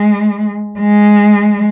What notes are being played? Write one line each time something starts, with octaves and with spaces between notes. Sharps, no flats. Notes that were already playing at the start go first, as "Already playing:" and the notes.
Already playing: G#3
G#3